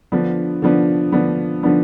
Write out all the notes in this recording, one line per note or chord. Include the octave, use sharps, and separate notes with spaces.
D3 F3 B3 D4
D3 F3 B3 D4
D3 F3 B3 D4
D3 F3 B3 D4